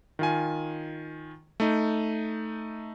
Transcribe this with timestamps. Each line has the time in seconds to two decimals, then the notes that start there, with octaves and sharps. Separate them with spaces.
0.19 D#3 F4 G#5
1.60 A3 D#4